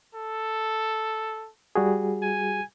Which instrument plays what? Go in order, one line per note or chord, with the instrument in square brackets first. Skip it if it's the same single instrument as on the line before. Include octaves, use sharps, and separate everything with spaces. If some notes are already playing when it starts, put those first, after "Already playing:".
[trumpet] A4
[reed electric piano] G3 F#4 G#4
[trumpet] G#5